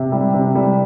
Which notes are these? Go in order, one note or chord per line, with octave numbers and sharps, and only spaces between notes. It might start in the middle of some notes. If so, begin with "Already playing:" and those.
Already playing: C3
G3
C3
G3